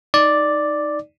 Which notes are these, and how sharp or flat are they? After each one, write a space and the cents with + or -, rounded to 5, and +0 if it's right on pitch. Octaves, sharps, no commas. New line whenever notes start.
D#4 +0 D5 +0